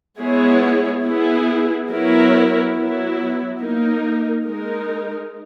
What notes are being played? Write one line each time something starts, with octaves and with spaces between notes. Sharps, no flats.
G#3 B3 E4 G#4 C#5
B3 E4 G#4
F#3 B3 E4 A#4 C#5
F#3 B3 E4
A#3 D#4 A#4
G#3 D#4 A#4